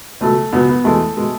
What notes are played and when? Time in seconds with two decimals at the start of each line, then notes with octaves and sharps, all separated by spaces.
0.21 C#2 B2 F#3 A3
0.53 C#2 B2 F#3 B3
0.70 B3
0.84 E2 B2 G#3 A3
1.17 B2 G#3